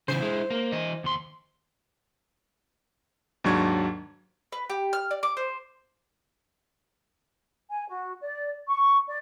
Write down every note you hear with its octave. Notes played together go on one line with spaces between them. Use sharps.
C#3 E3 C5
G#3 E4
A#3
E3 D#5
D#2 C6
D#2 G#2 F#3 D4 C#6 G#6
B4
G4
F6
D5
D6
C5
G#5
F#4
D5
C#6
D5